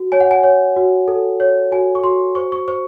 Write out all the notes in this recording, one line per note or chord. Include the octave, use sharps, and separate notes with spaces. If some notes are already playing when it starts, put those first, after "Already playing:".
Already playing: F#4
C#5 G#5
F#5
G#5
C#5
F#4
A4
C#5
F#4 G#5
C#6
F#4 C6
C5 C#6
C#6
C5 C#6